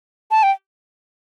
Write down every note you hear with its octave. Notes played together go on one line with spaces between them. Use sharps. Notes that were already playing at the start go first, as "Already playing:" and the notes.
A5
G5